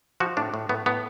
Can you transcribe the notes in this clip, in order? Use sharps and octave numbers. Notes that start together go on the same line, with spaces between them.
F3 F#4
A2 D4
A2
A2 B3
A2 B3